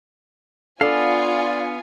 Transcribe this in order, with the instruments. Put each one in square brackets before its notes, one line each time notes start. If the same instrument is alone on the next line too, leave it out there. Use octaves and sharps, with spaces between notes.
[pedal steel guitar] B3 F5 [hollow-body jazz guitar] D4 A4 [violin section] F4 G#5 [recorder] D5